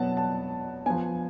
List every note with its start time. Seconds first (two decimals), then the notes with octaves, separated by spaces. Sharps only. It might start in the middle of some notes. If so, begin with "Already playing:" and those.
Already playing: B2 F#3 B3 F#5 A5
0.17 A5
0.86 F3 B3 G#5